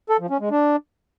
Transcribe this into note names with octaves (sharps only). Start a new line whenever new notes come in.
A4
F3
C#4
G#3
D4